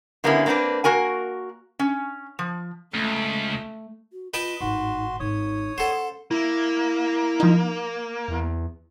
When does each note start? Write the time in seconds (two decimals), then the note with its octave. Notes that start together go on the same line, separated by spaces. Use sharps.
0.24 D3 G3 A#3 B3 C#4 E4
0.46 A#3 C4 D4 F#4 B4
0.84 A#3 F#4 A#4 G#5
1.79 C#4
2.39 F3
2.94 C#2 A3
4.13 F#4
4.34 F4 B4 D#5 G5 A5
4.61 G#1 A2 D#4 F#4 C6
5.20 G#1 D#4 C#5 D#6
5.78 C#4 A4 C5 F#5
6.31 A#3 E4
7.40 F3 D#4
8.28 E2